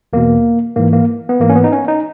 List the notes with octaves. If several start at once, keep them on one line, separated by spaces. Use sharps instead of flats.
E2 B2 A#3
G#2 E3 A#3
A#3
B3
G#2 E3 A#3
C#4
B3
D#4
C#4
D#4